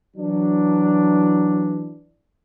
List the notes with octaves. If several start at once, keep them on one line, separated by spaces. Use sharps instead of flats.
E3 F#3 D4